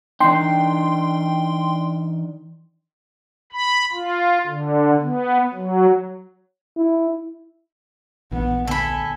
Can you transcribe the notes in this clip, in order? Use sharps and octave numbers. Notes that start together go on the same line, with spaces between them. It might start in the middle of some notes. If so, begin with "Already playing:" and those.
E3 D4 D#4 G5 C6
B5
F4
D3
B3
F#3
E4
A#1 G2 E3 B3
D2 D3 B3 A4 G#5 B5